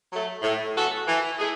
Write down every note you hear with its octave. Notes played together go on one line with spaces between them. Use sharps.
F#3 A3
A2
E3 B3 F#4 A4
E3
A3 E4 G#4